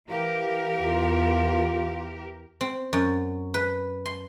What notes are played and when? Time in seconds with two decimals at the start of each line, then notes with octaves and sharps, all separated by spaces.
0.10 E3 G4 A#4 F5
0.80 E2 F4
2.61 C4
2.93 F#2
3.54 B4
4.06 C6